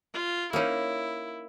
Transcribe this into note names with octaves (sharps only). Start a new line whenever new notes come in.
F4
A#3 C#4 D#4 E4